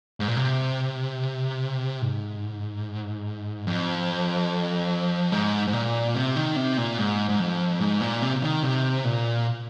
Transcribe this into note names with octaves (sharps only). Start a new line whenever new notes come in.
G#2
A#2
C3
G#2
F2
G#2
G#2
A#2
C3
D#3
C3
A#2
G#2
G#2
F2
G#2
A#2
C3
C3
D#3
C3
A#2